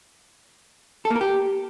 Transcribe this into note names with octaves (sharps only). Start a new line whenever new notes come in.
A4
A#3
A#4
G4